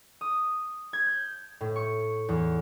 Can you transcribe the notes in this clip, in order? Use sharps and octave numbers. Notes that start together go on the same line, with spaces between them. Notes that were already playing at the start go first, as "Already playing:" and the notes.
D#6
G#6
G6
A2
C#6
E2